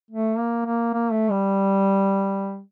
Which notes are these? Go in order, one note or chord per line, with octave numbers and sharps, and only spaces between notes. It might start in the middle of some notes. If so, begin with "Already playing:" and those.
A3
A#3
A#3
A#3
A3
G3